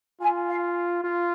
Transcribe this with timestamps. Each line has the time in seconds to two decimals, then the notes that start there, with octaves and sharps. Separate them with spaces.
0.21 F4 G#5
0.48 F5
1.04 F4